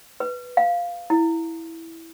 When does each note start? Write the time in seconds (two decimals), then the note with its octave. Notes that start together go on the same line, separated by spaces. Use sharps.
0.20 B4
0.57 F5
1.10 E4